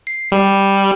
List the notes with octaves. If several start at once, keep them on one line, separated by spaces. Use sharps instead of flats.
C7
G3